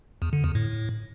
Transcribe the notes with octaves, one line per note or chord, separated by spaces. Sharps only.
E2
D3
E2
A2
A2